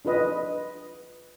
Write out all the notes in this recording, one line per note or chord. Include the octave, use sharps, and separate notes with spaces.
D4 F4 G#4 B4 D#5